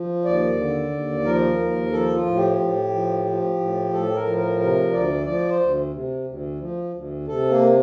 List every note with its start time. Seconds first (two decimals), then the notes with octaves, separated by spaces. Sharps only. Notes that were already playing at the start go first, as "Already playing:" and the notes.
Already playing: F3
0.25 D#2 D5
0.58 D3
0.91 D#2
1.25 F3 A#4
1.59 D#2
1.92 F3 A4
2.14 F4
2.26 A2
2.37 G4
2.59 A2
2.92 F3
3.26 F3
3.60 A2
3.93 A2 A4
4.15 A#4
4.26 F3
4.37 A#4
4.60 C3 A#4
4.93 D2 D5
5.26 F3 D5
5.49 C5
5.60 D2
5.93 C3
6.27 D2
6.60 F3
6.94 D2
7.27 C3 A4
7.50 A#3